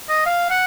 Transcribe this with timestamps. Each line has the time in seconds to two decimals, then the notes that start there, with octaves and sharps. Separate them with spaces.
0.09 D#5
0.26 F5
0.51 F#5